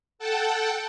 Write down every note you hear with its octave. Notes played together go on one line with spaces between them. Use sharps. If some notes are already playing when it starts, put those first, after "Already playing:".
A4 F#5 G5 A5